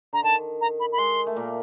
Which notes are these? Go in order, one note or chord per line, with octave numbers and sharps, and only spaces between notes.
D3 A#5
D#3 A5
A#5
B5
B5
G#3 C6
A3
A#2 A#3